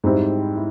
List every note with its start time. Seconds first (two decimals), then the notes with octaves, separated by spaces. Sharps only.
0.04 G#2 G3 C4 E4
0.56 E4